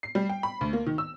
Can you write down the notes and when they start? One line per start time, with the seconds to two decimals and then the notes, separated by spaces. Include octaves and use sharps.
0.03 C7
0.15 G3
0.29 G5
0.43 B5
0.61 D2
0.73 A#3
0.86 D#3
0.98 E6